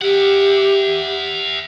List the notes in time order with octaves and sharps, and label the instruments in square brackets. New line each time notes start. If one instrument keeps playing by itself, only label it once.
[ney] G4 [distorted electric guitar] E5 F#5